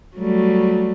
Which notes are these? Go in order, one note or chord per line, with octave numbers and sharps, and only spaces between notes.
F#3 G3 A3